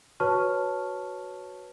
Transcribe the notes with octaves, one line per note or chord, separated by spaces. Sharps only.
F#4 B4 C#5 A5 C#6 F6